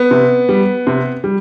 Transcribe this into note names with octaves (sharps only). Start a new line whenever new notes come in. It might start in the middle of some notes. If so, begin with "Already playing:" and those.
Already playing: B3
C3
G3
C3
G3